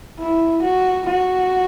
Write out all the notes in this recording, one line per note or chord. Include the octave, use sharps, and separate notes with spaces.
E4
F#4
F#4